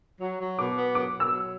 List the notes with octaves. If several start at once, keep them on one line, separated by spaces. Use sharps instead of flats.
F#3
F#3
B2 D6
B3
F#3 D6
B2
E6
F#3